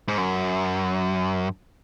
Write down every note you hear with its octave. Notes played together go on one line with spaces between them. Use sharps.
G#2
F#2